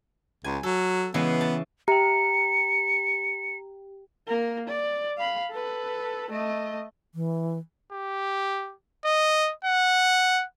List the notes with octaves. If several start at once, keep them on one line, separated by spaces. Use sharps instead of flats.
C#2 G#5
F#3 A4
C#3 E3 G#3 B3
A5
G4 G5 A#5 C#7
A#3 A#4
D5
F5 B5
A4 B4
A3 D#5
E3
G4
D#5
F#5